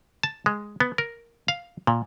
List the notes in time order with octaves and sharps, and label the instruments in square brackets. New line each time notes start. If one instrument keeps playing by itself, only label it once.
[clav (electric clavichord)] A5
G#3
B3
A#4
F5
A#2